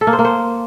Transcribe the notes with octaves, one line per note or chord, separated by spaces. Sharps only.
A4
A#3
C5
A#3
C5